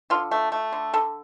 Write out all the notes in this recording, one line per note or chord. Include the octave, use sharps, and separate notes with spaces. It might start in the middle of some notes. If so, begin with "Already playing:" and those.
D3 F4
A3
A3
D3
D3 A4